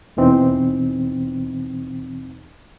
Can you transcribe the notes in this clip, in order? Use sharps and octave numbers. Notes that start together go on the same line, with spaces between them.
E2 B2 E3 C4 D#4